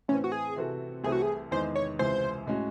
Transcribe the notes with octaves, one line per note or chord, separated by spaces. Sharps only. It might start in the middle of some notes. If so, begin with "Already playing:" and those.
A2 E3 C4 C#4
F#4
G#4
C3 E3 C4 F#4 A4
C2 C3 E3 A3 G#4
F#4
G#4
E2 D#3 G#3 C5
C#5
C#2 C3 E3 C5
A2 G#3 C#4 F#4